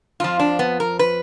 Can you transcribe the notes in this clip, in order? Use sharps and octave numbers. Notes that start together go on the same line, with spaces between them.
F2 F3 F4
D4
B3
A#4
B4